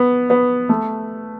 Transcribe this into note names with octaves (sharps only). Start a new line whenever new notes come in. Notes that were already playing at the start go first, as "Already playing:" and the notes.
Already playing: B3
B3
A3